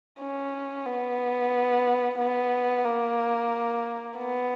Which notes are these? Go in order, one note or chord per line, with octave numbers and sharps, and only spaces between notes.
C#4
B3
B3
A#3
B3